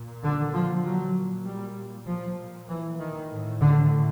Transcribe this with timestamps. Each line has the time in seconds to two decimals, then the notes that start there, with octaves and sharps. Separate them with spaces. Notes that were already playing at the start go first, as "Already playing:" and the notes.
Already playing: A#2
0.23 D3
0.54 F3
0.84 A#2 F#3
1.45 G3
2.07 A#2 F3
2.68 E3
2.98 D#3
3.29 A2
3.60 D3